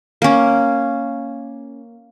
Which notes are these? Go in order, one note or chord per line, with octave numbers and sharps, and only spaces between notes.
A#3 C#4